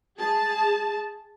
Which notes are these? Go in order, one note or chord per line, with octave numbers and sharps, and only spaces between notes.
G#4 A5